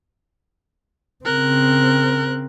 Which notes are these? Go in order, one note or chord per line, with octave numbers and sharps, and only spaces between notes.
C#3 C4 A#4 F#6